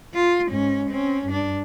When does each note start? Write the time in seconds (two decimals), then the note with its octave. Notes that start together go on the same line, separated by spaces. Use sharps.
0.14 F4
0.48 G#2 C#4
0.90 C4 C#4
1.27 G2 D4